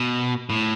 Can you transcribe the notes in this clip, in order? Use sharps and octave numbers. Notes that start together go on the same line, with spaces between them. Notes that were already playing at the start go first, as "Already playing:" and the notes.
Already playing: B2
A2